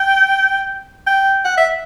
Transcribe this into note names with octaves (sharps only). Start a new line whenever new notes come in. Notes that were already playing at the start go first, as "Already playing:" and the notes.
Already playing: G5
G5
F#5
E5